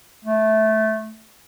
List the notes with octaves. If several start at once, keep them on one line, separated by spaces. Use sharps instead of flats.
A3